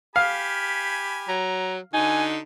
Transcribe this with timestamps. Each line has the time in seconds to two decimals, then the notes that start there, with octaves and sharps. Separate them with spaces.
0.16 G4 F5 G#5 B5
1.28 F#3 A#5
1.94 D3 D#4 F#4 G#5